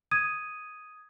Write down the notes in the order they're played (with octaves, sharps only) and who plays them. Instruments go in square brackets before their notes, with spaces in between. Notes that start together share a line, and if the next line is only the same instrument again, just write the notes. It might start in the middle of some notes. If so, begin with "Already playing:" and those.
[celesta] D#6 G#6 D#7